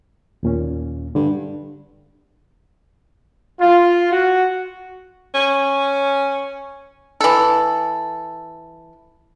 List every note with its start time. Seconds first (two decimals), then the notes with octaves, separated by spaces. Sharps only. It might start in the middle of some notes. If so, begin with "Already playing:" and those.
0.43 D#2 A#2 C#4
1.15 G2 D3
3.60 F4
4.10 F#4
5.34 C#4
7.21 E3 A4